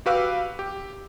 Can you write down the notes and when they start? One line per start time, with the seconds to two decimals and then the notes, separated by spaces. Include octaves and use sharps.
0.06 F#4 G4 B4 F5 D6 E6
0.59 G4